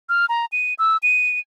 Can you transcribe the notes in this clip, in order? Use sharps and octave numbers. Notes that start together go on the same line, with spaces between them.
F6
A#5
D#7
E6
D#7